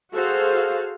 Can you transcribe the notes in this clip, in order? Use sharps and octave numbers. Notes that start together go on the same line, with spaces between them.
F#4 G#4 A4 C5 F5